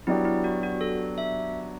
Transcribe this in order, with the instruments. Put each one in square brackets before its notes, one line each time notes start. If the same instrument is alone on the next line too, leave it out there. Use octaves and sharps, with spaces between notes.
[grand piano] F#3 B3 D4 G4 [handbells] E4
[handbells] E4
F#4
F#4
A4
E5